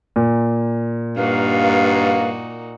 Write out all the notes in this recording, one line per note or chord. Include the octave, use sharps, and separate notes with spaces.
A#2
G2 A#3 D#4 F#4 B4 F5